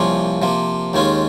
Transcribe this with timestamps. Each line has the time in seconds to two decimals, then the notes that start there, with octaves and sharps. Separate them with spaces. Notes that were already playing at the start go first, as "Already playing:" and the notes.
Already playing: C2 C3 F3 A#3 C#4
0.42 C3 F3 A#3
0.93 D#2 D#3 G#3 C#4 F4